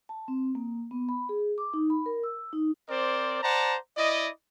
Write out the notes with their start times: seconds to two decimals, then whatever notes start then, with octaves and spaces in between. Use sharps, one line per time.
0.09 A5
0.28 C4
0.55 A#3
0.91 B3
1.09 B5
1.29 G#4
1.58 D6
1.74 D#4
1.90 B5
2.06 A#4
2.23 E6
2.53 D#4
2.89 C4 A#4 C5 D5
3.42 C5 D5 F#5 A5 A#5
3.97 E4 D5 D#5